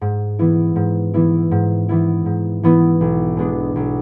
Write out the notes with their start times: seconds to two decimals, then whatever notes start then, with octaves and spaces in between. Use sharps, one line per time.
0.01 G#2
0.39 E3 B3 E4
0.76 G#2
1.14 E3 B3 E4
1.51 G#2
1.89 E3 B3 E4
2.26 G#2
2.63 E3 B3 E4
3.01 B1
3.37 B2 G#3 B3 D4
3.76 B1